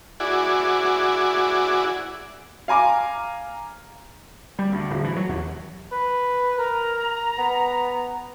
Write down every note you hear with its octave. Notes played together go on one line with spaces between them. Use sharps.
E4 F#4 G#4 D5
F5 G#5 A#5 D6
G3
D2
D1
E3
F#3
D#2
B4
A#4 A#5
B3